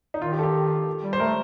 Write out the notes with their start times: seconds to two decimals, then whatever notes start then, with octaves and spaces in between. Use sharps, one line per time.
0.14 D#4
0.21 D#3 F4
0.32 G4
0.39 A4
0.43 G4
1.03 G3
1.13 C5
1.20 A3 A#4